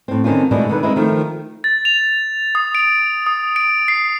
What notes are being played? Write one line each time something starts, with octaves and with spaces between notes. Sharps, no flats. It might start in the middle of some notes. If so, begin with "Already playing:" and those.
A2 C4
D3 D#3 C4 C#4 F4
B2 D3 G#3 A3 D4 E4
D3 D#3 B4
G#3 C4 D#4 E4
D#3 F3 A3
A6
F7
D#6
D7
D#6
D7
C7